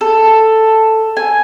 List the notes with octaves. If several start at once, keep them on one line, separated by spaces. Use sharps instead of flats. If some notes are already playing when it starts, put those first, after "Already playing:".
A4
G#5